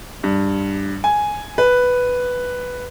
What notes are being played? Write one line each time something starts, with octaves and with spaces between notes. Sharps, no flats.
G2
G#5
B4